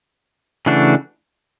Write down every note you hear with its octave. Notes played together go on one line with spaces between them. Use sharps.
C#3 E3 A3 D4 F#4